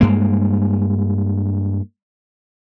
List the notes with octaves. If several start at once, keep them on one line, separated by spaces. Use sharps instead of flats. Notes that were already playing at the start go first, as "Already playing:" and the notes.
G2 G#3 A#3